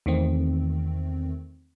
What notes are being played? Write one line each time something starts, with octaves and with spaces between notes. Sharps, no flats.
E2 D#3 A3 C4